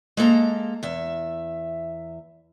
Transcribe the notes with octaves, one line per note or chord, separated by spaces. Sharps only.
G#3 A#3 A4 A#5
E2 E5